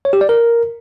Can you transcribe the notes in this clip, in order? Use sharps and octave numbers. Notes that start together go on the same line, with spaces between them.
C#5
G4
D5
A#4